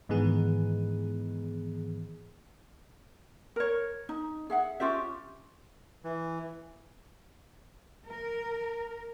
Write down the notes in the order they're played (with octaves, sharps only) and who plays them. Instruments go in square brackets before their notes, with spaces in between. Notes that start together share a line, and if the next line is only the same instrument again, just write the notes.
[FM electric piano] G#2 D#3 E3 B3 G#4
[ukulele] A#4 C#5
D#4
G#4 E5 F#5
C#4 F4 G4 E5
[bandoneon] E3
[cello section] A#4